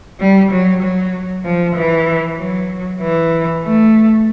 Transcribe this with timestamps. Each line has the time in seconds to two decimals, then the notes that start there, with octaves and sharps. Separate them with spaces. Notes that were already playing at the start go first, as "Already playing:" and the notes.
0.20 G3
0.51 F#3
0.82 F#3
1.45 F3
1.76 E3
2.38 F#3
3.01 E3
3.64 A3